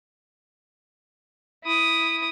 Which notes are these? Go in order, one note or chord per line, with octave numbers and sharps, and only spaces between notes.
E4 D#6